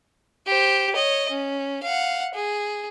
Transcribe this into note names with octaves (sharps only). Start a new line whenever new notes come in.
G4 C5
C#5 D#5
C#4
F5 F#5
G#4